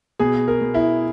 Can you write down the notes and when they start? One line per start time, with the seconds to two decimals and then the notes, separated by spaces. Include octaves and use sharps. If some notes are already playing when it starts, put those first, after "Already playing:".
0.19 B2 G#4
0.48 A#4
0.61 B2
0.74 E4